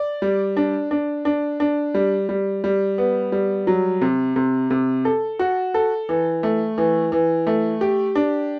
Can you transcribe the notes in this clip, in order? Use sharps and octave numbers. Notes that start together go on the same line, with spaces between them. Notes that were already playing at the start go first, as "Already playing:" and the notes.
Already playing: D5
G3
D4
D4
D4
D4
G3
G3
G3
B3
G3
F#3
C3
C3
C3
A4
F#4
A4
E3
A3
E3
E3
A3
G4
D4